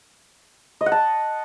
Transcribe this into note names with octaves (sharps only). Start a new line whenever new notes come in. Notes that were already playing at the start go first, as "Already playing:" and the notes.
D#5
F#5
A5